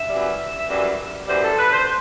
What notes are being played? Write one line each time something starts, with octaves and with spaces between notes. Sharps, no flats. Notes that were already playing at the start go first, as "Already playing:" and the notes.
Already playing: E5
F#2 E3 G3
F#2 E3 G3
F#2 E3 G3 C5
A4
B4
C5